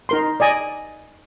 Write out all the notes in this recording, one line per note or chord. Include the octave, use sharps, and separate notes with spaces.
D#4 A#4 C6
D5 D#5 G#5